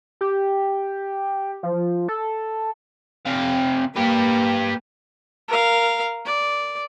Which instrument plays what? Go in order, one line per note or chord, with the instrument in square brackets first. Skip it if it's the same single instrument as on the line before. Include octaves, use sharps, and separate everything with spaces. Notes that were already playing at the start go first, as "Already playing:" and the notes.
[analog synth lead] G4
F3
A4
[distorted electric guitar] C3 F5
[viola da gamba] A#3 [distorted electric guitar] G4 B4
[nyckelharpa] A#4 F5
D5